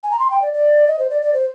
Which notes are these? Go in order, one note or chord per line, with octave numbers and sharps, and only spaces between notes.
G#5
A#5
C6
G5
D5
D5
D#5
C5
D5
D5
C5